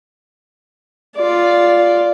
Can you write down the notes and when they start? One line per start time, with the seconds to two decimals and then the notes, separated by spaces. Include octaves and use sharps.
1.17 F4 D5